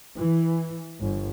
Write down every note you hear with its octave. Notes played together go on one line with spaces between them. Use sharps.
E3
G1